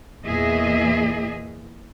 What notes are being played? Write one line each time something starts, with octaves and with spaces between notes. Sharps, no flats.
E2 A#2 E3 G#4 D#5 E5